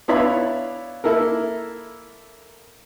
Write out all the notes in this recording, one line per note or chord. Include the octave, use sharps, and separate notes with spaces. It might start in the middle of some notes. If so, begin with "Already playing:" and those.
B3 D4 E4 C#5 F5 B5
A#3 E4 A4 A#4